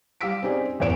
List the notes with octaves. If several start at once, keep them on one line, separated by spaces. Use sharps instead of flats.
G3 G4 F5 E6 B6 D7
C4 C#4 D#4 G4 G#4 D5
E1 E2 A2 C#5 D7 E7